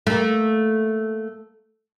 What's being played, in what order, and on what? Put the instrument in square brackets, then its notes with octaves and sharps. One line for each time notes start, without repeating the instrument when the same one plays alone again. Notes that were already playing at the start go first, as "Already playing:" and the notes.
[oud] A3 A#3